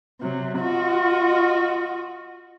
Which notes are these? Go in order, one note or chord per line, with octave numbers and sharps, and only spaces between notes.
C3 F#3
F4 F#4 D#5